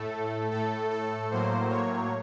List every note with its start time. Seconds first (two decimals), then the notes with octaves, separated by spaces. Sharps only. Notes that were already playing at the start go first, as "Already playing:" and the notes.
Already playing: A2 A3 A4
0.51 A2 A3 A4
0.90 A4
1.30 A2 F#3 A#3 C5
1.70 C#5